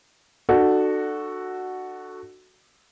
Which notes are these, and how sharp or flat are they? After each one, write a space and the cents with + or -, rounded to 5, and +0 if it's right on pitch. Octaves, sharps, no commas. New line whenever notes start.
D4 +40 F#4 +0 A4 +0